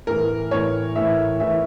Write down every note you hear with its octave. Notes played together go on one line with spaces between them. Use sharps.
A2 E3 A#4
A2 E3 C#5
A2 E3 E5
A2 E3 E5